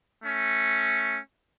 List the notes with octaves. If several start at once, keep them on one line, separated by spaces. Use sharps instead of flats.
A3 C#4